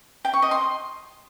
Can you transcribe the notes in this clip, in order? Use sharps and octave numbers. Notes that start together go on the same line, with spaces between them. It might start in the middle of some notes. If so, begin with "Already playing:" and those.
G5
C#6
D#5
C6